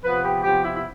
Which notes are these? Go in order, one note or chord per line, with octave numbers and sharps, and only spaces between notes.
C3 F3 B3 B4
G4
C3 F3 B3 G4
E4
E4